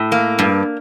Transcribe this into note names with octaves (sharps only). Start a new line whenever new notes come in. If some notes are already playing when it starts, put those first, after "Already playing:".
Already playing: A2
A#3
G2